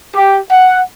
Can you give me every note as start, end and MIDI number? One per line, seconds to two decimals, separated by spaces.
0.15 0.37 67
0.51 0.80 78